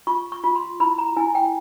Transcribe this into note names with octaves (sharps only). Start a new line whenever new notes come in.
F4 C#6
C#6
F4
C6
E4 B5
A#5
E4 G#5
G5